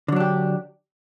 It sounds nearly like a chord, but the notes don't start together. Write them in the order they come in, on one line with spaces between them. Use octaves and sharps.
D3 F#3 D4 G4